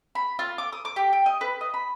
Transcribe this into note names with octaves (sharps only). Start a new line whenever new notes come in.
B5
F4
D6
D#6
D6
G4
G5
D#5
B4
D#5
B5